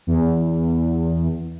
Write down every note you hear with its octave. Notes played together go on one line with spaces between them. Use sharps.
E2